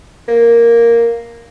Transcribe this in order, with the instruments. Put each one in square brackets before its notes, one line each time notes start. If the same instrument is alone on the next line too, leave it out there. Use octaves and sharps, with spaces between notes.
[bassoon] A#3